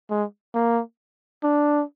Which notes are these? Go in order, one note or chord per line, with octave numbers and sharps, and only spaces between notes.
G#3
A#3
D4